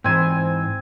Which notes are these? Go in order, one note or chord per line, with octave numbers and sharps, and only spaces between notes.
G#2 E3 C4 C5 G#5